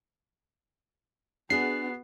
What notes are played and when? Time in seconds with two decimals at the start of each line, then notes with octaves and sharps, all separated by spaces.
1.50 B3 D4 F#4 G#4 C7